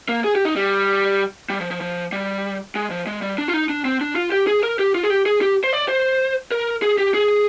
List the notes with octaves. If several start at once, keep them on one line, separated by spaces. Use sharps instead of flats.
A#3
G#4
G4
D#4
G3
G3
F3
F3
F3
G3
G#3
F3
G#3
G3
D4
F4
D#4
D4
C4
D4
F4
G4
G#4
A#4
G4
F4
G#4
G4
G#4
G4
C5
D5
C5
A#4
G#4
G4
G#4